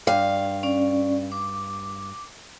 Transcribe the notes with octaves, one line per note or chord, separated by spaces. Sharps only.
G2 F5
C#4 D5
D6